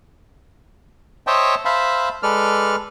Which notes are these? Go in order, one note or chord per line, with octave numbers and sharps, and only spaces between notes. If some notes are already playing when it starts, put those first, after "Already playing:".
C5 C#5 D#5 E5 G5 A5
C5 E5 F5 A5 B5
G#3 A4 B4 D5 F6